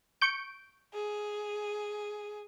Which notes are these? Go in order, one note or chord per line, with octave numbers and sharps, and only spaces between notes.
C#6 G6 D7
G#4